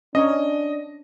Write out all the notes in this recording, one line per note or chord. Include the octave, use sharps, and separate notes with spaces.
C#4 D4 C#5 D#5 A#5